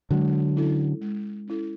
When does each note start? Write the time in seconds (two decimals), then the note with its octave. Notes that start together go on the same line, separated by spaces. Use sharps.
0.11 D3 F#3 G#3
0.56 C#4 E4 A4
1.01 G#3
1.47 C#4 E4 A4